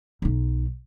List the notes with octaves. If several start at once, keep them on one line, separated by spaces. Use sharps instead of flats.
B1 D#4